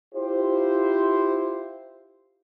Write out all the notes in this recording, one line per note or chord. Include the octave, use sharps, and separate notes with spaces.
E4 F4 G4 C5